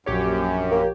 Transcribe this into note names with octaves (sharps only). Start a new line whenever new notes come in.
A#1 F#2 G4 C#5
A#3